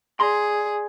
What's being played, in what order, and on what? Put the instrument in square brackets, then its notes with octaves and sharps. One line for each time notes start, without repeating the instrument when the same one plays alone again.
[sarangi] G#4 [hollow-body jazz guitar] D5 A#5 C6